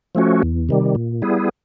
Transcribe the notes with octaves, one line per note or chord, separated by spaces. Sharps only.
F3 A3 C#4 F#4
E2
C3 D#3 G3
A#2
G3 B3 E4 G#4